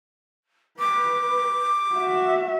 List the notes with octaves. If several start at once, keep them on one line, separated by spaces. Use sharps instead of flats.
B4 D6
F#4 E5